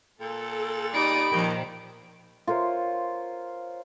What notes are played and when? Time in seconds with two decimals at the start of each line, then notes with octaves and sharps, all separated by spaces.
0.21 A#2 A4
0.94 D#4 G4 D5 B5 D#6 D7
1.32 D#2 A#2 D#3 F3
2.47 F4 A#4 C5 C#5